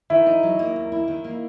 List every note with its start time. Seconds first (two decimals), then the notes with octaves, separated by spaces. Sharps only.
0.10 D#3 E4
0.26 D#4
0.43 F#3
0.59 A#3
0.76 D#2
0.92 E4
1.08 D#3
1.24 A#3